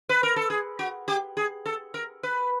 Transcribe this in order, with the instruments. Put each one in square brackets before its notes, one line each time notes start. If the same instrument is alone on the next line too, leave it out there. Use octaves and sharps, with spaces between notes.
[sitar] B4
A#4
A4
G#4
F#4
G4
G#4
A4
A#4
B4